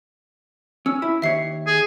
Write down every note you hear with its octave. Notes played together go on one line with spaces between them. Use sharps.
C#4 E6
E4
D#2 C#5 E5 C7
G#4